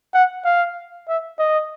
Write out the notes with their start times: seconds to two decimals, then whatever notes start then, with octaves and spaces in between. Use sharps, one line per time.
0.14 F#5
0.45 F5
1.08 E5
1.39 D#5